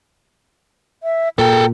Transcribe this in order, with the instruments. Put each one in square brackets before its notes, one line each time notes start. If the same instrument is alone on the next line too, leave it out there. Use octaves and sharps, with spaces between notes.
[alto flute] E5
[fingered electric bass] A#2 [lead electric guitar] A4 A#4 [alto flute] G5